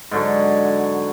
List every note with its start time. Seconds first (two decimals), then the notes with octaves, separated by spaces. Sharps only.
0.11 G#2 D3 F#3